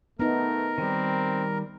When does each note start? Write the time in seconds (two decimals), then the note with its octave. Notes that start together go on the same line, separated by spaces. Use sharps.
0.19 A3 B3 D#4 A#4
0.78 D#3 G3 C4